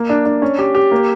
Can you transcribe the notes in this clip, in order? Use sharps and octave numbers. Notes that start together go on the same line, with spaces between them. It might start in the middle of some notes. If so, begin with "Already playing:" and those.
Already playing: A#3
D4
D4
C#4
G4
G4
A#3